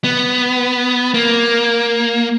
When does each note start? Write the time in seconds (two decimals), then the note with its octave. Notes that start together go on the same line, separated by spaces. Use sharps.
0.04 B3
1.14 A#3